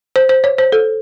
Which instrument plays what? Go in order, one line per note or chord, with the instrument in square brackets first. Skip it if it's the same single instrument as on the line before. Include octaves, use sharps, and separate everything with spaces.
[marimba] C5
C5
C#5
C5
A4